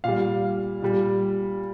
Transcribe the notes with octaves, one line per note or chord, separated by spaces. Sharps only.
A#2 G3 F5
A#2 G3